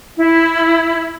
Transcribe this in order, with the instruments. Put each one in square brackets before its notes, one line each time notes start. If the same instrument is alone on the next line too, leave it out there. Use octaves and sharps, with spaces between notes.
[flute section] E4